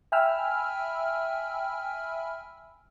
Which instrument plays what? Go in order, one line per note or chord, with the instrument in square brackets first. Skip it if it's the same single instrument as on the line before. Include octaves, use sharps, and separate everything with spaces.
[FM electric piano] E5 G5 G#5 B5 E6 F6